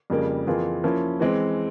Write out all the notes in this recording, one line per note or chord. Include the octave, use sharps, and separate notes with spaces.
F2 C#3 G3 A#3
F2 E3 A#3 F4 G#4
F3 A#3 C#4 E4
E3 G#3 C4